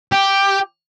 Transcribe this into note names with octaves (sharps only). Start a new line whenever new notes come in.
G4